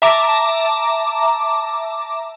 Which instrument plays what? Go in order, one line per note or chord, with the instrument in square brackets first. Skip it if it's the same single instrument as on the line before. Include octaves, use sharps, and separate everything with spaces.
[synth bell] E5 A5 A#5 D6